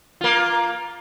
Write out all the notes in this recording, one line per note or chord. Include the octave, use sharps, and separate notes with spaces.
A#3 F4